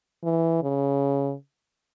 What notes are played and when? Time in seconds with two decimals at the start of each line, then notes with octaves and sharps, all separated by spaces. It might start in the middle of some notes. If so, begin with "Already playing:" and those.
0.24 E3
0.63 C#3